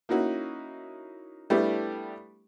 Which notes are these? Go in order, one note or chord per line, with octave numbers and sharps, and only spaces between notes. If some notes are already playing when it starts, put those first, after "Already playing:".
A#3 C#4 D#4 E4 F#4
G3 A3 B3 D4 E4 G4